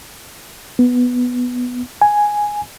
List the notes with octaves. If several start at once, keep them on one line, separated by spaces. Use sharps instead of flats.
B3
G#5